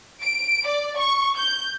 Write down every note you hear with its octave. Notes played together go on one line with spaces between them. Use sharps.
D7
D5
C#6
G6